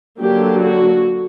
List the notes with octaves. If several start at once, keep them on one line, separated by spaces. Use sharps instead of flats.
D3 F#3 A#3 D4 G4
F#4